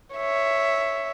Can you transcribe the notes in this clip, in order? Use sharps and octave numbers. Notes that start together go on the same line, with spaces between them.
C#5 E5